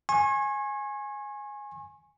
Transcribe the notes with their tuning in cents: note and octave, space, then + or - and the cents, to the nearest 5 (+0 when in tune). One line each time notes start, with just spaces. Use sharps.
G#5 +0 C#6 -40